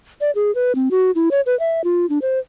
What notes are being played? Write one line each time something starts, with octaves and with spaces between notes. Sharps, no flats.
D5
G#4
B4
C4
F#4
E4
C#5
B4
E5
F4
D4
C5